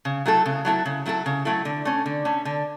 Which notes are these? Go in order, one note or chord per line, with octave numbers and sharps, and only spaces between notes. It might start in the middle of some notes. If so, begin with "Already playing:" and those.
C#3
F#3 A3 E4 A4
C#3
F#3 A3 E4 A4
C#3
F#3 A3 E4 A4
C#3
F#3 A3 E4 A4
D3
A3 C#4
D3
A3 C#4
D3